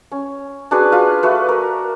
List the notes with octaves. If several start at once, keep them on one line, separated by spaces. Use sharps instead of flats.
C#4
D4 F#4 G#4 B4
F4 B4
A3 F#4 B4
A#4